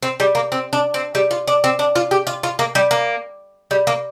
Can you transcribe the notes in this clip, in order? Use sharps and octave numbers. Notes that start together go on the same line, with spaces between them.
C4
G3
A#3
C4
D4
C4
G3
F4
D4
C4
D4
F4
G4
F4
F4
A#3
G3
A#3
G3
A#3